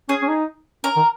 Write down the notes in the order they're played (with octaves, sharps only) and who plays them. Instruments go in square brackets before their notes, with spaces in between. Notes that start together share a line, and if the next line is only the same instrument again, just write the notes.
[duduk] C#4 [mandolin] G#4
[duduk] C#4
D#4
[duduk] C#4 [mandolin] A#4
[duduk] D#3